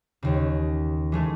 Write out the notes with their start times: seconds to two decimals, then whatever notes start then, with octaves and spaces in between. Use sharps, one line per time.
0.22 D#2 C#3
1.12 E3 G#3 A3